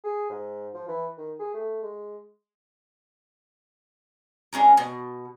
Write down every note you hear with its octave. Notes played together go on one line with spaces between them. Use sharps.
G#4
G#2
F3
E3
D#3
G#4
A3
G#3
G#3 C#4 D#4 A#4
B2